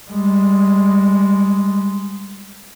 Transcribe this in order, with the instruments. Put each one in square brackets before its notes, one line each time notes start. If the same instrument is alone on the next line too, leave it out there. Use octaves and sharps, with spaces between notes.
[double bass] G3 G#3